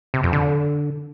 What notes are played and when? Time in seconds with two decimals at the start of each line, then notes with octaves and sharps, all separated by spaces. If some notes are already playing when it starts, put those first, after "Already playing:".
0.14 C3
0.23 F2
0.33 D3